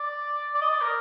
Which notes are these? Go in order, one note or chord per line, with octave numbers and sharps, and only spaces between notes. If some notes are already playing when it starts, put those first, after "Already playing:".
Already playing: D5
D5
D#5
D5
A#4